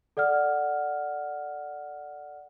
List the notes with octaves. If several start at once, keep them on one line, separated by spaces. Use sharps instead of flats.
A4 D5 F#5 F6